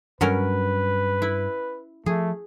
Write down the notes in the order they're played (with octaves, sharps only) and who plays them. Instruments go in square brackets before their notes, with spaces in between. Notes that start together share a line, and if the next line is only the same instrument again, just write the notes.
[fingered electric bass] G2 [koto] F#3 C#4 A#4 [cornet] B4
[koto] E4
[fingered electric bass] F3 [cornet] A3 [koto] G#4